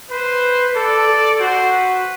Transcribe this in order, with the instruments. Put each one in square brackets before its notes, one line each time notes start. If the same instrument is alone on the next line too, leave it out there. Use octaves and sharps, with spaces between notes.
[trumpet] B4 [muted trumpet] C5
[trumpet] A4 [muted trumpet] D5
[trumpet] A4
[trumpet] F#4 [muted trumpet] C5
[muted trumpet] B4